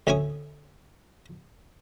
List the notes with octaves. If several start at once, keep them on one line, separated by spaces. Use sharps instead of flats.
D2 C#4 E5 G#5 C#6 D#6